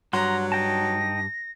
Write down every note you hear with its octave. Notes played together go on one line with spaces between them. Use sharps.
G2 F#3 F#5 A#5 C6
D#4 G5 A5 A#6